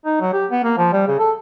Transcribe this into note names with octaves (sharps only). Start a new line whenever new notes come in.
D#4
F#3
G4
B3
A#3
F3
G3
C#3
A4